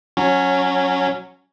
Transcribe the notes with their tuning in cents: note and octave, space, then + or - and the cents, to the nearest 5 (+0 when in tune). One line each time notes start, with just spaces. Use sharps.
F#3 -15 C#4 +0